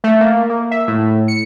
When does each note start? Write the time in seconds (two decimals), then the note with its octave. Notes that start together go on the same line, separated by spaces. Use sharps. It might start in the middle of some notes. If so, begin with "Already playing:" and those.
0.04 A3
0.21 A#3
0.50 A#3
0.71 E5
0.88 A2
1.28 C#7